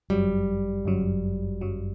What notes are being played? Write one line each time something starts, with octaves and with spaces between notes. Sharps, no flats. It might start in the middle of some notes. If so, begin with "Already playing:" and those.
G1 F#2 F#3 G3
G1 F#2 F#3
G1 F#2 F#3